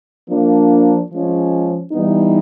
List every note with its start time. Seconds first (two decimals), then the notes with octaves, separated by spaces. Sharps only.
0.28 F3 A#3 D4
1.11 F3 G#3 C#4
1.92 E3 G3 B3 D#4